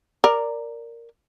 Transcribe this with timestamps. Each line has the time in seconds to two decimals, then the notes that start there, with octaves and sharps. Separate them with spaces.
0.24 A#4 D5